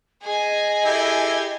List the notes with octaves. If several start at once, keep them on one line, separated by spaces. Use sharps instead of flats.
G#4 D#5 G#5
E4 G4 A4